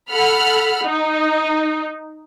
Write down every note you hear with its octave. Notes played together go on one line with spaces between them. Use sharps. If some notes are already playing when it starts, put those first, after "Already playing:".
A4 F#5 B5 F6
D#4